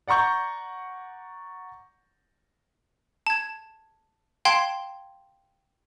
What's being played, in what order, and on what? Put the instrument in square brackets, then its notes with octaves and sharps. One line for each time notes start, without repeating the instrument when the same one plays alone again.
[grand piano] D5 F#5 A#5 C#6 G6
[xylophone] A5 G#6
F5 G5 A5 C6 G#6